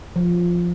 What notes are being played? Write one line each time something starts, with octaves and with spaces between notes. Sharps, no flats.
F3